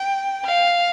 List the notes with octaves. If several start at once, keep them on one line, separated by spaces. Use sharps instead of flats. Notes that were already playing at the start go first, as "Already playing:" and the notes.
Already playing: G5
F5